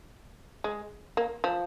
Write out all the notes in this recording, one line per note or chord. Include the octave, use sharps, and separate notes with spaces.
G#3
A#3
F3